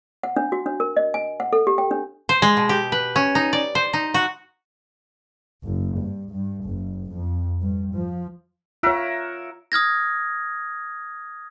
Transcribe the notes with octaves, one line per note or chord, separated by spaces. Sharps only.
F#5
D4
F#4
D4
A#4
D#5
G#5
F#5
A4
G4
G5
D4
C5
G#3
B2
G4
B4
C#4
D#4
D5
C5
D#4
F#4
F#1
G2
G2
F#1
F2
G2
F3
F4 A#4 C#5 E5 F#5
D#6 F6 G#6 A#6